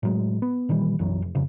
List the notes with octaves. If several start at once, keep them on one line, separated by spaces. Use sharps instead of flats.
A2 F#3 G#3
B3
A#2 D#3 E3 G3
B1 F#2 E3 F#3
F1
D1 F2 C#3 F3